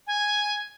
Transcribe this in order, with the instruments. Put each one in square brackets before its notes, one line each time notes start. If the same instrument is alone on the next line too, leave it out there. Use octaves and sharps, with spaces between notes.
[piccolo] G#5